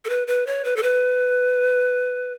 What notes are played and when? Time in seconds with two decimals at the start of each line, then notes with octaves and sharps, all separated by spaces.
0.05 A4
0.09 B4
0.27 B4
0.47 C#5
0.65 B4
0.76 A4
0.83 B4